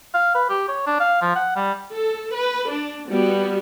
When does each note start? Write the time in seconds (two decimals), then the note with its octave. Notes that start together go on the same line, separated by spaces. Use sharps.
0.14 F5
0.35 B4
0.50 G4
0.69 C#5
0.87 D4
1.00 F5
1.22 F3
1.36 F#5
1.56 G3
1.93 A4
2.34 B4
2.70 D4
3.09 G3 B3 F#4